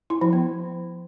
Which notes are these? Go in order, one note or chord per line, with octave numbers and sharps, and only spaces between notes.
E4
F3
B3